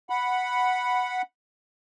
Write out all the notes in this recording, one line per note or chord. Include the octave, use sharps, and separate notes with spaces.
F#5 B5